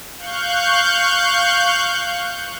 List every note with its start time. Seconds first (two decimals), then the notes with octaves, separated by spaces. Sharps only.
0.18 F5 C#6 F#6 G6